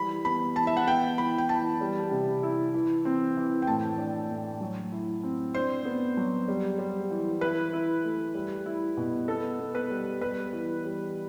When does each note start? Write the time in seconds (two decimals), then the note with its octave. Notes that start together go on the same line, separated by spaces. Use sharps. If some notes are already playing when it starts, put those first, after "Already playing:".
Already playing: E3 G3 B5
0.25 B3 B5
0.56 E3 A5
0.67 E5
0.77 F#5
0.87 B3 G5
1.18 E3 B5
1.38 G5
1.49 E3 A5
1.81 G3
2.11 C3
2.43 E4
2.74 E3
3.05 C4
3.37 E3
3.62 G5
3.67 A2 A5
3.98 D4
4.30 A2
4.61 F#3
4.92 E4
5.23 C4
5.54 D4 C5
5.85 B3
6.17 F#3
6.48 G3
6.78 G3
7.11 E3
7.41 E4 B4
7.73 E4
8.04 A3
8.34 G3
8.66 E4
8.97 B2
9.28 B3 A4
9.59 B3
9.75 B4
9.90 G3
10.21 G3 B4
10.53 E3
10.84 G3